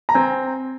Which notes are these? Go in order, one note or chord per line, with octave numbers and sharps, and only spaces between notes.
A#5
C4 G#5